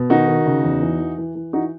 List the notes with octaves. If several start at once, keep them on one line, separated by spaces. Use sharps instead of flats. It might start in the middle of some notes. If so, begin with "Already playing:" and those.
Already playing: B2
D#3 D#4 F#4
D#3
C#3
E2
E3
E3
E3
E3
E3 D#4 F#4